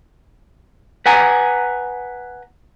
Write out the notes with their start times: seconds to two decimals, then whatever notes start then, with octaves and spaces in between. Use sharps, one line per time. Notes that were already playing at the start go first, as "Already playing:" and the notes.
1.06 B4 F#5 G#5 A#5